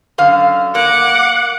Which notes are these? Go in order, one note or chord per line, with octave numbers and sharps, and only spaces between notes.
F#2 D3 F5
A#3 F#5 D6